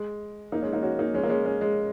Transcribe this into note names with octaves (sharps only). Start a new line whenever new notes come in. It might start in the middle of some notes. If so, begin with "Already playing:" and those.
Already playing: G#3
A#3 D#4
G#3 C#4
A#3 D#4
C#4 F#4
A#3 D#4
G#3 C#4
A#3
G#3 C#4
G#3 C#4
G#3